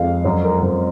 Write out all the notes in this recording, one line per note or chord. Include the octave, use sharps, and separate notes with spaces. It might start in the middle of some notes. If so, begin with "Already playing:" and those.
Already playing: F2 G#3 F5
F#2 C#5
A#4
F#2 C5